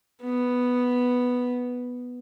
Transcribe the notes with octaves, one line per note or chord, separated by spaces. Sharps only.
B3